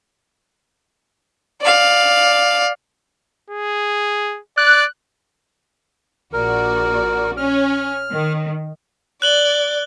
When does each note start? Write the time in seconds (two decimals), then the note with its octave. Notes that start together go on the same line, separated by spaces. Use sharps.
1.61 D5 F5
3.50 G#4
4.58 D5 F#6
6.33 A#1 F#4 A#4 D5
7.37 C#4 F6
8.10 D#3
9.22 D5 F#6 F#7 G7